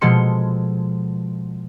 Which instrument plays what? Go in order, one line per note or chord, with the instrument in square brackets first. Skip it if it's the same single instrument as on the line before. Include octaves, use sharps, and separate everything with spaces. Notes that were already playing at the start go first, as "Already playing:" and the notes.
[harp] B2 F3 G#3 A4 C6 C#7